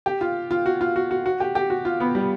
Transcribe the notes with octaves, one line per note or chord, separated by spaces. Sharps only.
G4
F4
F4
F#4
F4
F#4
F#4
F#4
G4
G4
F#4
F4
B3
G3